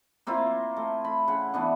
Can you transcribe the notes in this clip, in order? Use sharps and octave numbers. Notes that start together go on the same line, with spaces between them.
A#3 C4 E4 F4
A3
B5
C#3 F#5
E3 B3 D4